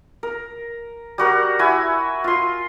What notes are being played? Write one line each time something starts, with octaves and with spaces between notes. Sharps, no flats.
A#4
G3 F#4 A#4
E4 F#4 E5 G#5
F4 C6